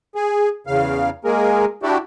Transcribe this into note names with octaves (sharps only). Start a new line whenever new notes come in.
G#4
E2 C#3 F5
G#3 A#3 G#4 A#4
D4 E4 F#4 G4